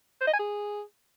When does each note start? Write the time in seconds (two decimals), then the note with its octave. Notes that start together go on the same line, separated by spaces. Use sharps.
0.21 C5
0.27 D#5
0.33 G#5
0.39 G#4